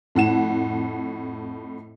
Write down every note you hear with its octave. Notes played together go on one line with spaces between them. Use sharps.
F2 A2 F#5 E7